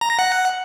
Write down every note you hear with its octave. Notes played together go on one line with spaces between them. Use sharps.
A#5
A#6
F#5